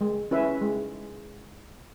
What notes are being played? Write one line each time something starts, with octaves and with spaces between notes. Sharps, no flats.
G#3
C#4 E4 B4 E5
G#3